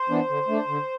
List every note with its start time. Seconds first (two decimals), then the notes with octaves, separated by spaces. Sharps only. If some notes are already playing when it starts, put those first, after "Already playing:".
Already playing: C5
0.09 E3 B3 D4
0.29 D3
0.48 A3 D4
0.68 D3